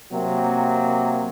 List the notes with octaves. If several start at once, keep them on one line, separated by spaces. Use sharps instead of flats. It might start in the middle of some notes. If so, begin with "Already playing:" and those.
C3 F#3 A#3